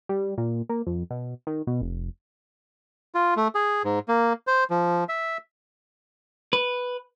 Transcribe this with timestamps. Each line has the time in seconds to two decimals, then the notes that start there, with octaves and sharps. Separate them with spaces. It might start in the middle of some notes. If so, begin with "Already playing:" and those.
0.09 G3
0.38 A#2
0.69 A#3
0.87 F2
1.11 B2
1.47 D#3
1.67 B2
1.81 F1
3.15 F4
3.37 A3
3.55 G#4
3.85 G#2
4.08 A#3
4.47 C5
4.70 F3
5.09 E5
6.53 B4